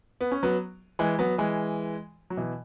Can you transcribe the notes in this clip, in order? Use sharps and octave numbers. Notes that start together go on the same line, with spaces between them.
B3
C#4
F#3 B3
E3 G#3
F#3 B3
E3 G#3
F#3
B2 E3